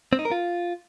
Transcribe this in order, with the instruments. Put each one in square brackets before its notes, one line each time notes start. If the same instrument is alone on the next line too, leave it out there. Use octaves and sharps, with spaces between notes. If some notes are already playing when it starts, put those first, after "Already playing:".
[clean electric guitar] C4
D#4
A#4
F4